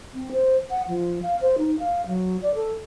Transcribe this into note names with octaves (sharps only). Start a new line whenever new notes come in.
C4
C5
F#5
F3
F5
C5
D#4
F5
F#3
D5
A4